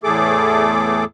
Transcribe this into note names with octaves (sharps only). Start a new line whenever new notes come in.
E2 A2 A3 G#4 A4 D6